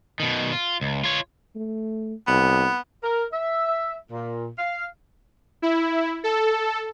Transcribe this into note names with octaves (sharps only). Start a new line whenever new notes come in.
B2 D#3
F4
C#2
F4 C#5
A3
C2 B3
A#4
E5
A#2
F5
E4
A4